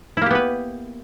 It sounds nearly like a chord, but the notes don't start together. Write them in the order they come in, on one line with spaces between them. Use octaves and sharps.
E4 A#3 G4 B3 B4